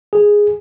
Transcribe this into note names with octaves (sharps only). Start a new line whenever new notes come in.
G#4